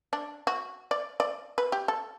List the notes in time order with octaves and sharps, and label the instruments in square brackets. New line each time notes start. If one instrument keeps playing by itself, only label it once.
[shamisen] D4
F#4
D5
D5
B4
G4
A4